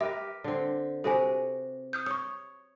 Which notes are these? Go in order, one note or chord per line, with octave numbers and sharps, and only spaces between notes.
G4 A#4 B4 E5
D3 C4
C3 F#4 A4 B4 G#5
D#6 F6 G6
C#5 C#6 D#6